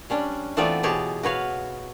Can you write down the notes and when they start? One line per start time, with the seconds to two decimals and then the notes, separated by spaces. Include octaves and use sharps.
0.10 G3 C#4 D4
0.57 E3 A3 B3 C4 F4 D5
0.83 B2 G4 G#4 C#5 A5
1.23 F#4 B4 C#5 F5